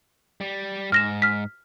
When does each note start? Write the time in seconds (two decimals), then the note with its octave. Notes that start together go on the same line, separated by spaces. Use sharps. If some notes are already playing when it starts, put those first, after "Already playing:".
0.41 G3
0.92 G#2 F6 A#6 E7
1.22 F6 B6